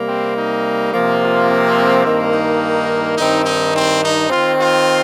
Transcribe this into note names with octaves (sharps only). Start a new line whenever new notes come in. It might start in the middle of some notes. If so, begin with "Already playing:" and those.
Already playing: C3 G3 A#3
C4
D#4
C3 F3 A#3
F4
C4
G2 D#3 A#3
D#4
G2 D#3 C4 D#4
D#4
C4
D#4
D#3 C4 F4
F4